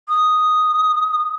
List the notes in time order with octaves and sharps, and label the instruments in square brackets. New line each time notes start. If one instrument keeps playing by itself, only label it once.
[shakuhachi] D#6